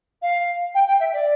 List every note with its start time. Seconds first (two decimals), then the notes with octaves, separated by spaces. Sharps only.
0.22 F5
0.75 G5
0.88 G5
1.00 E5
1.13 D5